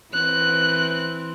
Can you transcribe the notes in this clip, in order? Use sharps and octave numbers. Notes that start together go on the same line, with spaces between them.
E3 C4 F#6